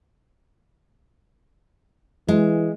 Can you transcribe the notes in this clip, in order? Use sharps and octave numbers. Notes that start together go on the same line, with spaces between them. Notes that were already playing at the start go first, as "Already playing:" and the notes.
E3 G#3